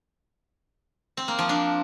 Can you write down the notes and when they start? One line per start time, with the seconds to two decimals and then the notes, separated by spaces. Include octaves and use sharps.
1.17 C4
1.28 A#3
1.39 F3
1.49 D4